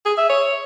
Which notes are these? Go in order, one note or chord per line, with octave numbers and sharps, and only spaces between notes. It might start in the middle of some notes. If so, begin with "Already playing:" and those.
G#4
E5
C#5